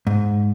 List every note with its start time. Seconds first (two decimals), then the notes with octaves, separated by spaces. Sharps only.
0.07 G#2